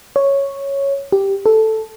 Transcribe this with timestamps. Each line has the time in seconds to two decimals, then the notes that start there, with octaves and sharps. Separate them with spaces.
0.16 C#5
1.12 G4
1.46 A4